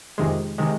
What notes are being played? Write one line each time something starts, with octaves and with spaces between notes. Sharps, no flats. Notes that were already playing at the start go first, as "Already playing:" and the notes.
F2 C3 D#3 G#3
C3 D#3 G#3